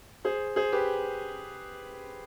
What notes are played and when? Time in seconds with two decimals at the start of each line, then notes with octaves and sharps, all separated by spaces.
0.25 G#4 C5
0.56 G#4 C5
0.72 G4 B4